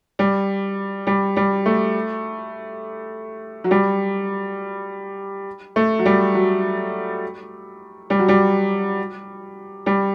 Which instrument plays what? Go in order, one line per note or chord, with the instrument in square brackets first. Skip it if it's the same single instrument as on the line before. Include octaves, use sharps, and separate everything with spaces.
[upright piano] G3
G3
G3
A3
F#3
G3
A3
F#3
G3
F#3
G3
F#3
G3
G3